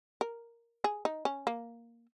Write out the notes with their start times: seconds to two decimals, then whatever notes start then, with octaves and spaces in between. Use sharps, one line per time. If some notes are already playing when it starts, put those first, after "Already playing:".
0.21 A#4
0.84 G#4
1.05 D#4
1.25 C#4
1.47 A#3